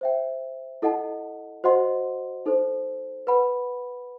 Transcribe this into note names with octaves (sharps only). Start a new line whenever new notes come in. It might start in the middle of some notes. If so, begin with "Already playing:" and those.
C5 E5 G5
E4 A4 D#5 F#5 A5
F#4 C5 D#5 F#5 C6
D#4 A4 C5
B4 F#5 B5